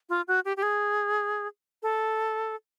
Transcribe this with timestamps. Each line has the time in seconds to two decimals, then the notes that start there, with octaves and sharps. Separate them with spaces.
0.09 F4
0.28 F#4
0.45 G4
0.57 G4
0.63 G#4
1.83 A4